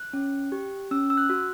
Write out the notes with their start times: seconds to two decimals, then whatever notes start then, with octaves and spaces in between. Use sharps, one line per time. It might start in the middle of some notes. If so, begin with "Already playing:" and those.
Already playing: F#6
0.13 C#4
0.52 G4
0.91 C#4 E6
1.10 E6
1.17 F#6
1.30 F#4